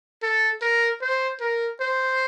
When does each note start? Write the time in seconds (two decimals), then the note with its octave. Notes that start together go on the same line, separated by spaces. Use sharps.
0.22 A4
0.62 A#4
1.01 C5
1.41 A#4
1.80 C5